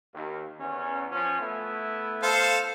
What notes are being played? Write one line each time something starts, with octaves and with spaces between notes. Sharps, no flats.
D#2
E2 C#4
F3 C#4
A3 B3 E4
A4 C5 F5